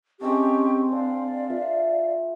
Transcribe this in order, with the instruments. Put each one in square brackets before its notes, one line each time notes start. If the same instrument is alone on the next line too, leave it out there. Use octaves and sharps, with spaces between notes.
[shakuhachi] C4 [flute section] C#4 G4 C#6 [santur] G#4 D#5 A5
[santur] D4 [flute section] D5 F5
[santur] F4 B4 E5